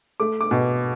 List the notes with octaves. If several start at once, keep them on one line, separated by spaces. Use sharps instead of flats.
A3 D6
D6
B2